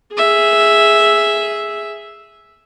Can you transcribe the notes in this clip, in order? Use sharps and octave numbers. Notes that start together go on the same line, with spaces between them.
G#4 E5